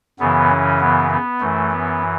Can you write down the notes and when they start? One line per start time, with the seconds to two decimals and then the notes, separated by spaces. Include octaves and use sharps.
0.19 F#2 C#3 E3 B3
0.50 C#4
0.81 B3
1.11 B3
1.40 F#2 E3 A3
1.71 B3